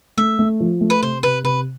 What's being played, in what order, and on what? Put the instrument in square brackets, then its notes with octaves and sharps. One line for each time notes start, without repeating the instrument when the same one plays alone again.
[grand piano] A3 [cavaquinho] E5
[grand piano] A3
F3
A3
[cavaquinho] B4
[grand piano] C3 [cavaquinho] C5
[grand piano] C3 [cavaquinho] B4
[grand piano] C3 [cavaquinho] B4